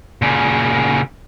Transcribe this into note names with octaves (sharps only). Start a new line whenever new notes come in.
A#2 C#3